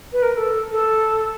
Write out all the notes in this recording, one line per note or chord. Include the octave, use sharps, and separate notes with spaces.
B4
A#4
A#4
A4
A4